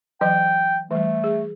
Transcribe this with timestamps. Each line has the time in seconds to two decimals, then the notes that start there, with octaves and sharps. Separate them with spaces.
0.21 E3 F#3 D#5 G5
0.91 E3 G3 A3
1.24 G#4